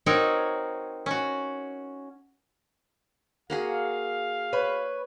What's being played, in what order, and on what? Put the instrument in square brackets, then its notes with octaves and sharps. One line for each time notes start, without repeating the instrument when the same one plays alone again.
[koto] C4 D#4 F#4 A#4 C#5
C#4 F#4
[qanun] A#3 F#4 G#4 [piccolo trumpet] F5
[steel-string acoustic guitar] B4 C#5